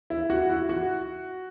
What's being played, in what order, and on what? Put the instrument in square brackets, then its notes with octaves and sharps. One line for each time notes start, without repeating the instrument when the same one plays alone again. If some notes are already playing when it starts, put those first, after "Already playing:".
[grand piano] E4
F#4
E4
F#4